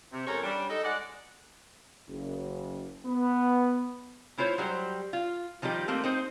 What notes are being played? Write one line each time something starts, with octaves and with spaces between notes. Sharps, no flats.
C3
E2 G#3 C#4 A4 A#4 C#5
G3 C#4 D4
D#4 A4
G#3 D5 F#5
F#1
B3
A3 E4 F4 C5 C#5
F#3 G3 F#4 G4 C5
F4
D#3 F3 G3 D#4 G4
A3 A#3 C4
C4 D#4 C5